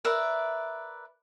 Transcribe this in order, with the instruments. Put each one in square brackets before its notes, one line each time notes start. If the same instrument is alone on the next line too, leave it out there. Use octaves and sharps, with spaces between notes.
[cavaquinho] A#4 B4 D5 E5